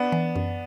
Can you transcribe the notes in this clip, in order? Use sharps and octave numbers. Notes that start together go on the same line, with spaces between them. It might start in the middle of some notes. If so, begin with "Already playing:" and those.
Already playing: B3 D4
E3
F#2